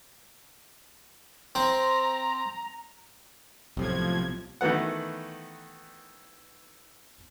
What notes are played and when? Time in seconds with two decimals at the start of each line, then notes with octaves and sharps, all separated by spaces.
1.55 C4 A#5
3.77 B1 A2 C3 F3 G#6
4.61 D#3 E3 A3 B3 F#5